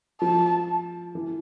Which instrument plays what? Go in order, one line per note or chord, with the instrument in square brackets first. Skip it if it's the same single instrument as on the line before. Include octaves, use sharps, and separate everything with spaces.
[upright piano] F3 [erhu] A5
[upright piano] E3